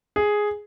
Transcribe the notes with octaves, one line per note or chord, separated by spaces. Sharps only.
G#4